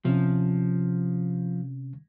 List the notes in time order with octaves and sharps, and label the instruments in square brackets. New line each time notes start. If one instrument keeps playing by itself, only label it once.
[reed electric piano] C3 C#4 [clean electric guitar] F3